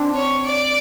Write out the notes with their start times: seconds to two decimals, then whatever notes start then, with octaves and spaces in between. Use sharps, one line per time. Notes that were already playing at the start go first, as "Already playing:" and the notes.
Already playing: C4 D4
0.15 C#5
0.45 D5